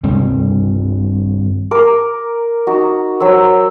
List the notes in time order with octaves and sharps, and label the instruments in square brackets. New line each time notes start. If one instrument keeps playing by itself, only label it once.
[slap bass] G2 C3 D#3 G3
[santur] A#4 D6
D#4 F#4
F#3 C5 E6